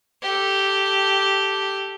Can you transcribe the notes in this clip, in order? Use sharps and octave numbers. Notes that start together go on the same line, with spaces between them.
G4 A4